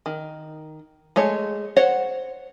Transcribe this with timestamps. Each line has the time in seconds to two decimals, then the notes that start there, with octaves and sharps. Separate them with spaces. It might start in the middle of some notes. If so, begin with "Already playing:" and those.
0.06 D#3
1.16 G#3 A3 C#5
1.77 C5 C#5 F#5